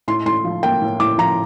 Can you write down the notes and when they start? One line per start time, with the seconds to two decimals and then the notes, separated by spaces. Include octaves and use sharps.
0.08 A2 C6
0.26 A2 C6
0.44 F3
0.63 A#3 G5
0.82 A2
1.00 A2 D6
1.18 F3 A#5